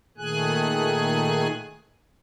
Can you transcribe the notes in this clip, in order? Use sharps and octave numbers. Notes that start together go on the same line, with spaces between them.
A#2 D#3 A3 G#4 G#5 F#6